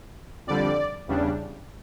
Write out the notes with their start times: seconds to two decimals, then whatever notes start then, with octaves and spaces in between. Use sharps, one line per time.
0.47 F2 D3 G3 D5
1.08 E2 C#3 G3 D4